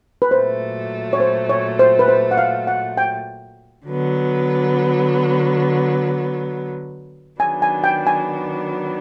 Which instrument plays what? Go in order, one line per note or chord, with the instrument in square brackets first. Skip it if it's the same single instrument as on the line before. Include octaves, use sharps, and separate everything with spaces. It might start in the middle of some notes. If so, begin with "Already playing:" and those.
[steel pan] B4
[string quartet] A#2 F#3 A3 [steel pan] C5
[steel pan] C#5
C5
C#5
C5
B4
C5
F#5
F5
F#5
G5
[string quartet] D3 F#3 B3
[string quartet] D#3 F#3 B3 D4 [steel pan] G#5
[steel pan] G#5
G5
G#5